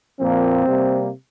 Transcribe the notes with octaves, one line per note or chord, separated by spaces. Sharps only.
A#2 F3 A#3 C4
C3 G3 A#3